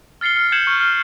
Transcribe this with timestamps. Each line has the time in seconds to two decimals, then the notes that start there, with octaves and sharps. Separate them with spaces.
0.21 F6 A6 C7 C#7 G7
0.36 F6
0.52 G6 G#6 C#7 E7 F#7
0.67 C#6 F6
0.80 F6 G7